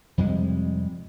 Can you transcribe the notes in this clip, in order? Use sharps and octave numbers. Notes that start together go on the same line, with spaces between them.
F2 C3 G3 G#3